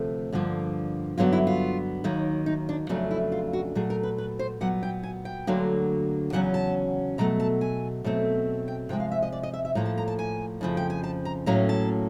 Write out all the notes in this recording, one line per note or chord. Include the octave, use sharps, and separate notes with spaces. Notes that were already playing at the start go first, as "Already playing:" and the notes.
Already playing: D2 C3 F3 A3
G2 D3 F3 A#3
G2 D3 F#3 B3 F4
E4
F4
D#2 D#3 F#3 A#3
D#4
D4
F2 C#3 F#3 A3 D4 D#4
E4
F4
F#4
A#2 F#3 A3 G#4
A#4
B4
B4
C5
A#2 F#3 B3 F#5
G5
G#5
G5
D2 D3 F#3 A#3
E2 C#3 F#3 C#4 F#5
A5
B2 F#3 A3 A#5
A5
G#5
B2 F#3 A3 C4
G5
C3 F3 G#3 G5
F5
E5
D#5
D5
D#5
E5
E5
A2 F3 A#3 A#5
A5
A#5
A5
G#5
F2 C#3 F3
G5
G#5
A5
A#5
A2 F#3 A#3 C#4 A#5
A5